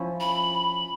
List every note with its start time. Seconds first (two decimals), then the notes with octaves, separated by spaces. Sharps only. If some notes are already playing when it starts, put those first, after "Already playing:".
Already playing: F3 C#4 E4
0.20 B5